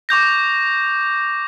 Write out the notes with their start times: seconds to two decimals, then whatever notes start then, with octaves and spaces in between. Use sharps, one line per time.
0.09 C#6 D6 G6 A#6